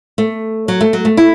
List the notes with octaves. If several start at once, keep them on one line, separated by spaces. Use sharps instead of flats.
A3
F#3
A3
F#3
A3
E4